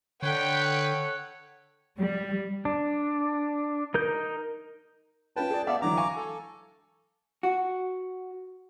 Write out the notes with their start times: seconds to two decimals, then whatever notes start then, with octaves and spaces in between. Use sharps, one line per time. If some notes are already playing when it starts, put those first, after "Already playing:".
0.23 D3 A4 B4 C#5 F#5 G5
1.98 G3
2.65 D4
3.94 D#4 A#4 G6
5.36 C#4 F4 B4 G5 A5
5.51 G#4 D5
5.67 B3 D5 E5 F5
5.82 D3 E3 F#3 A#5 D6
5.97 F5 G#5 C#6
6.16 A4
7.43 F#4